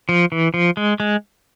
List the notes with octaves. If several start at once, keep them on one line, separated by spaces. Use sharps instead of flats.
F3
E3
F3
G#3
G#3